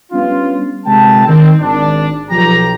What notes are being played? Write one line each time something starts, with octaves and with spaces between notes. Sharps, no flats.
G3 B3 C#4 D4 F4
G1 C3 G#3 G5 A5
D#3 C4
G#1 D4
B1 F3 G4 A#5